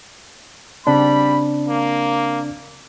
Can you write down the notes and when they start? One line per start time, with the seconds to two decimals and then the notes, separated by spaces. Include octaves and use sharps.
0.87 C#3 G3 C4 D4 B5
1.69 A#3